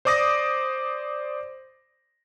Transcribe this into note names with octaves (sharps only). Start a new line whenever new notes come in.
C5 D5 D6 D#6 A#6